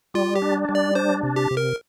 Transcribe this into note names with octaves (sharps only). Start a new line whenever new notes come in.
G3 F4
G4
D4
G3
D5
D4 C5
C3
G4
C3
A#4